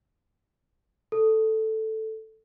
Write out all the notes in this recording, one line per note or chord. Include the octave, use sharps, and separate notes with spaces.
A4